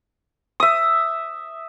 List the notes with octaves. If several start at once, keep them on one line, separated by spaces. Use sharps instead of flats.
E5 D#6